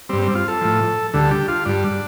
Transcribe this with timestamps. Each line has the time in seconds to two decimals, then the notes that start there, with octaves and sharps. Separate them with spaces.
0.09 G2 G3 C4
0.22 C4
0.35 F4
0.48 A4
0.61 A2 F3
1.13 D2 D3 G3 A4
1.31 G4
1.48 F4
1.65 G2 G3 D4